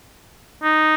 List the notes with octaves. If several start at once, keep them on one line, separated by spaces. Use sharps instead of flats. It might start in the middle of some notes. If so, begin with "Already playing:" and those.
D#4